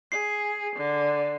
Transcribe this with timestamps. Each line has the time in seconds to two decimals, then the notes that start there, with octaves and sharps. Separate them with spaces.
0.12 G#4 C7
0.76 D3